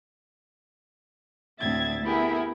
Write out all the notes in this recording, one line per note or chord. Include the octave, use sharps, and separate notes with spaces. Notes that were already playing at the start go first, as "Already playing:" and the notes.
D2 A2 C4 E5 G#6 A6
B3 E4 G4 G#4 A#4